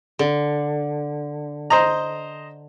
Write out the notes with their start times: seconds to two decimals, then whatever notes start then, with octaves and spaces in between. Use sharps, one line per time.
0.19 D3
1.70 C5 D#5 A#5